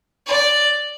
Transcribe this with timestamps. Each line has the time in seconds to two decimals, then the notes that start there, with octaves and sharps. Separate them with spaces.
0.26 D5